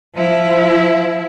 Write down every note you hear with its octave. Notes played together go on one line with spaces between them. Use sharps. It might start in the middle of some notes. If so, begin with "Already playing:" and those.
F3 E4